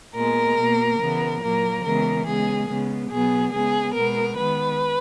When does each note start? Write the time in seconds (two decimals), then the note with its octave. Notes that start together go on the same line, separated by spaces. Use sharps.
0.15 A#2 G#3 B3 A#4
0.57 B2 A#3
0.99 C#3 E3 B3
1.43 A#2 F#3 A#3 A#4
1.84 C#3 E3 G#3 B3 A#4
2.27 C#3 G#3 B3 G#4
2.69 C#3 G#3 B3
3.11 B2 F#3 B3 G#4
3.53 C#3 G#3 B3 G#4
3.95 B2 G#3 B3 A#4
4.37 D#3 G#3 B3 B4